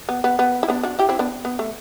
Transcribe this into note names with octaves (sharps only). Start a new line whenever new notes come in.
B3
B3
B3
E4
B3 D4
D4 F#4
E4 G4
C4 E4
B3 D4
B3
A3